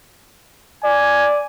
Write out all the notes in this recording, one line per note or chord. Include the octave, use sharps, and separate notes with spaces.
D5 G#5